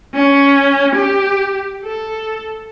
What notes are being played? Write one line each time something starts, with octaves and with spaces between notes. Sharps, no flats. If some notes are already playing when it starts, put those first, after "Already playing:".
C#4
G4
A4